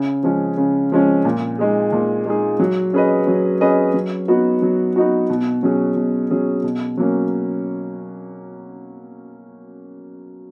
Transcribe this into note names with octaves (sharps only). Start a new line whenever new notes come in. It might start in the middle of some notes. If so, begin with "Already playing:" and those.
Already playing: C#3
F3 G#3 C#4
C#3
F3 G#3 C#4
A#2
G#3 D#4 G#4
A#2
G#3 D#4 G#4
F#3
C#4 G#4 B4 D#5
F#3
C#4 G#4 B4 D#5
F#3
B3 D#4 F#4
F#3
B3 D#4 F#4
B2
F#3 C#4 G#4
B2
F#3 C#4 G#4
B2
F#3 A#3 C#4